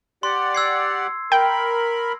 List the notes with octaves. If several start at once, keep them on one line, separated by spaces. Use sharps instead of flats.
G4 D5 F#5 C6
E6 G#6 C7
A#4 G5 B5